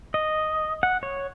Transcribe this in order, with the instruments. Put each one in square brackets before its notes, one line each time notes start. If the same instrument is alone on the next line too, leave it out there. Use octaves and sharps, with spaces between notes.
[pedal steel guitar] D#5
F#5
C#5